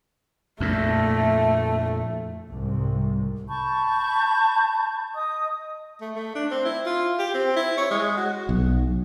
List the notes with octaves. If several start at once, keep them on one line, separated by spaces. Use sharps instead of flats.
F2 A#2 A3
C2 G#2 C3
A5 B5 C#6 G6
D#5 D#6
A3
A3
D4
C4
E4
F4
G4
C4
E4
C#5
G#3
F#4
B1